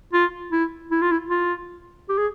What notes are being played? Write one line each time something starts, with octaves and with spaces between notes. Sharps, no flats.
F4
E4
E4
F4
E4
F4
G4
G#4